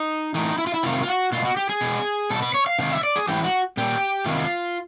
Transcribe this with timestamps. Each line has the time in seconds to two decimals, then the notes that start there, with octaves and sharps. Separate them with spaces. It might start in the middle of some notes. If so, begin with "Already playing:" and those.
Already playing: D#4
0.35 A2 E3 D#4
0.58 E4
0.67 F4
0.74 E4
0.83 C3 D#3 F4
1.03 F4
1.08 F#4
1.32 B2 F4
1.45 F#4
1.57 G4
1.69 G#4
1.81 B2
2.30 B2 A4
2.42 B4
2.54 C#5
2.67 F5
2.79 C3 D#3 F5
2.92 E5
3.03 D5
3.16 G#4
3.28 A2 E3 G4
3.44 F#4
3.77 A#2 G4
4.26 C3 D#3 F4